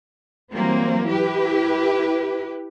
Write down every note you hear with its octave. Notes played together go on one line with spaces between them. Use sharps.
E3 F#3 G3 A#3 C4
E4 G4 B4